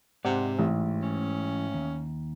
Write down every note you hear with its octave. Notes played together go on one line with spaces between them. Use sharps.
G#2 C3 D5 F#5
A1 E3
C#4
D#2